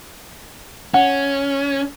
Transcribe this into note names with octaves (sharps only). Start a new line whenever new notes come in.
C#4 F#5